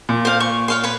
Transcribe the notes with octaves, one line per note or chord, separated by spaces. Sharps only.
A#2
C5 F5
C#6
C#5 F5 C6
B4 C#5